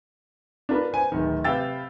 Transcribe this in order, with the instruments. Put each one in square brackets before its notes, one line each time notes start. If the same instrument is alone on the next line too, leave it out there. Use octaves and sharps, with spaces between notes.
[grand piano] D4 F4 A#4 B4
B4 C5 G#5
D1 D#3
C3 B4 F5 G5 E6 A6